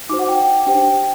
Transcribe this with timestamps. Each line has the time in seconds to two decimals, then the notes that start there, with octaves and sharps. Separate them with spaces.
0.09 D#4 F#4 C5 D6
0.19 F#5
0.29 G5
0.67 D4 G4 C5 G5